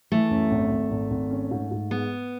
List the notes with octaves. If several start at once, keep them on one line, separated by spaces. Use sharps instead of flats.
E3 A3
F#2
G#1
G#1
G#1
G#1
C#4
G#2
G#2
G#3 B3